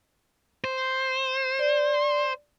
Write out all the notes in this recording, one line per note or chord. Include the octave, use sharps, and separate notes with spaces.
C5
D5